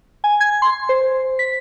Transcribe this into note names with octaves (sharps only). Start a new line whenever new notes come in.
G#5
G#6
C6
C5
B6